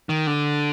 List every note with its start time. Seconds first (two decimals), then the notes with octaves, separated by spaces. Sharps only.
0.09 D#3
0.27 D3